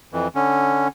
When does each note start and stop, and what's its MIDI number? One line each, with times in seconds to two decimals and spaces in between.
0.12 0.28 41
0.12 0.28 52
0.35 0.88 50
0.35 0.88 61